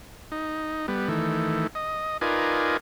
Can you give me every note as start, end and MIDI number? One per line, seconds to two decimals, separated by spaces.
0.32 0.86 63
0.88 1.08 55
0.88 1.08 59
1.09 1.67 51
1.09 1.67 52
1.09 1.67 57
1.75 2.17 75
2.21 2.77 63
2.21 2.77 65
2.21 2.77 70
2.21 2.77 71
2.21 2.77 74
2.21 2.77 80